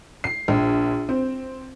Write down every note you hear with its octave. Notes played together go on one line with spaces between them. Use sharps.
C7
A#1
C4